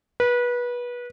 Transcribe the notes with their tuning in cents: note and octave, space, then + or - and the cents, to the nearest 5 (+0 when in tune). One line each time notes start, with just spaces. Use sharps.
B4 -25